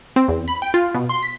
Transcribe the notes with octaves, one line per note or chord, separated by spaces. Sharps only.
C4
E2
B5
G5
F4
B2
C6
B6